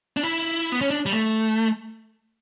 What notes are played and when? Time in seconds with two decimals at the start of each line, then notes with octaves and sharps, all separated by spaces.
0.17 D4
0.23 E4
0.72 B3
0.81 C#4
0.90 D4
1.06 G3
1.13 A3